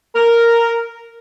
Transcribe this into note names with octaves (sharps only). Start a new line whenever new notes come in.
A#4